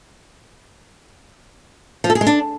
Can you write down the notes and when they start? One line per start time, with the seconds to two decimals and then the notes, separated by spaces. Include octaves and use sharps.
2.04 F3
2.10 A4
2.15 G#4
2.21 G#3
2.27 D4